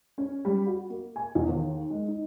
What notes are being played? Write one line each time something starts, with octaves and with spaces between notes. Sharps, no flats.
C#4
G3
F#4
A#3
G#5
E2
D#2
G#3
D#4